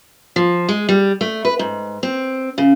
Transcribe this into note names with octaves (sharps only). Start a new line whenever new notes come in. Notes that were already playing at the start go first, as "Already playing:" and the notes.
F3
G#3
G3
A3
B4
G#2
C4
C#3